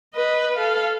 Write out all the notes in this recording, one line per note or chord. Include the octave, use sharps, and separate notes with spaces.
B4 D#5
A4 F5